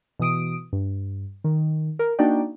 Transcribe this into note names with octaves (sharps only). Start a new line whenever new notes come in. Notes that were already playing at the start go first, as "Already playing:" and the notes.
B2 E3 D#6 D7
G2
D#3
A#4
A#3 D4 D#4 F#4 D5 G5